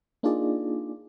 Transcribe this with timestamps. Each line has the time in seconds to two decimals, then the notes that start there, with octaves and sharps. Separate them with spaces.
0.23 A#3 D4 D#4 F4 G#4 D5